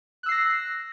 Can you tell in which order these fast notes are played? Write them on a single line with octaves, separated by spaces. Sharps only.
F#6 E6 C7 A#6